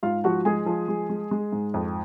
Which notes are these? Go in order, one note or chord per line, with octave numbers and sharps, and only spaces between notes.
G#2 F4 F5
F3 F#4 F#5
G#3 G#4 G#5
F3
G#3
G#3
G#3
G#2
F2